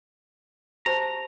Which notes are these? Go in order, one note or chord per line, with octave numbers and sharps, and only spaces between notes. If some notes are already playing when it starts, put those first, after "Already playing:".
G4 C5 A5 A#5